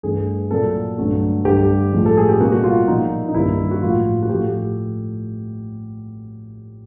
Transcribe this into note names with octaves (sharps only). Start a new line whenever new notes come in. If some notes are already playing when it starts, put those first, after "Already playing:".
G2 E3 A3 G#4
A#2 F#3 A#3 A4
G2 D3 F#3 A3
G2 D3 G3 G4
A2 F3 G#3
A4
G#4
G4
B2 G3 A#3 F#4
F#4
F4
A#2 F3 A#3 D#4
D#4
G2 D#3 G3 A#3 E4
F#4
A2 F3 A#3 F4
F#4
A2 F3 A3 G4